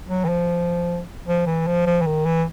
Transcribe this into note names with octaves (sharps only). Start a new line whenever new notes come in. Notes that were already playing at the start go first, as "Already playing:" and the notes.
F#3
E3
F3
F3
E3
F3
F3
E3
D#3
E3